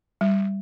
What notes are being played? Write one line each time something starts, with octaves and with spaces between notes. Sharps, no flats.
G3